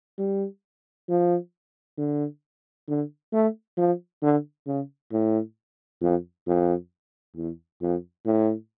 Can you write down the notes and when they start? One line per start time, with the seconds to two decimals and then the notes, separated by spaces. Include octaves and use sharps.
0.18 G3
1.09 F3
1.98 D3
2.88 D3
3.33 A3
3.77 F3
4.22 D3
4.67 C#3
5.12 A2
6.01 F2
6.47 F2
7.36 E2
7.81 F2
8.25 A2